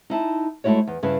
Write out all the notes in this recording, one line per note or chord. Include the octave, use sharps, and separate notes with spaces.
D#4 E4 A5
G#3 A3 C#4 E4 F#4 C#5
E2
G2 C#3 E4 B4